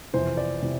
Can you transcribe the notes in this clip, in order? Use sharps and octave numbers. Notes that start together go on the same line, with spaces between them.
F2 C3 E3 C5
D5
C3 E3